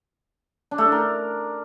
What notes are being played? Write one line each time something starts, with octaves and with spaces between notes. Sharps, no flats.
D4
A3
D4
A#4